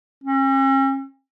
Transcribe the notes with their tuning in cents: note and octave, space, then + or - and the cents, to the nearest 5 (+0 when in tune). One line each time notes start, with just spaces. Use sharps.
C#4 -45